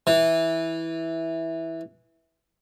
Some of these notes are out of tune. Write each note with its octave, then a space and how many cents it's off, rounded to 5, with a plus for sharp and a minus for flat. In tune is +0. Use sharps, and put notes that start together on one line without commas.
E3 -10